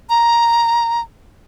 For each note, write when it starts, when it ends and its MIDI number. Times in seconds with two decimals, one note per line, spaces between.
0.10 1.00 82